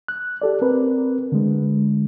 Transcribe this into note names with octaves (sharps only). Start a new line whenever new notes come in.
F#6
G4 A4 D5
C4 A#4 B4
D3 G#3